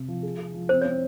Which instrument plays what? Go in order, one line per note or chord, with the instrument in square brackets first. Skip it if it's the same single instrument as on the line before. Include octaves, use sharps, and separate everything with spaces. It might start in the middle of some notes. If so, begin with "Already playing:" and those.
Already playing: [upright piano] C3
F3
G#4
G#4
F3
[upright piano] C4 [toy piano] C5
[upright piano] C4 [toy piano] C#5